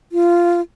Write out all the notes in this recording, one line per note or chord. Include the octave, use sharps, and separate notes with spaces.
F4